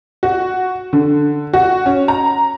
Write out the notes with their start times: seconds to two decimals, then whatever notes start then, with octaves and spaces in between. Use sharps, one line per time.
0.23 F#4
0.93 D3
1.53 F#4
1.86 C#4
2.08 A#5